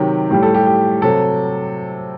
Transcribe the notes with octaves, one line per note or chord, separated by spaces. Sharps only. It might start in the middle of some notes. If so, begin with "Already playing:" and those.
Already playing: C3 D#3 F#3 G4
A2 G3 G4
A4
G4
G4
C3 F#3 A4